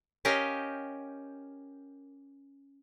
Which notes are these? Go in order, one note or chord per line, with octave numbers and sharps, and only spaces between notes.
C#4 G4 A#4 D#5 F5 G5